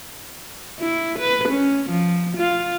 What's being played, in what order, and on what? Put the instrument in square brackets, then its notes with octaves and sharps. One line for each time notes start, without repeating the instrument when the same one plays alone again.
[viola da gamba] E4
B4
C#4
F3
F4